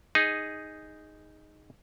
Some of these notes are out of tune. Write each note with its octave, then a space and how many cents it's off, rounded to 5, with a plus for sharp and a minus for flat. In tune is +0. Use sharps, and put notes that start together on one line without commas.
D#4 +0 G#4 -10